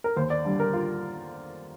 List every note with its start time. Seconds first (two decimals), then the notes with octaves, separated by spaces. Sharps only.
0.04 A#4
0.17 D#2 C5
0.30 D5
0.45 D3 G3
0.60 A#4
0.73 F4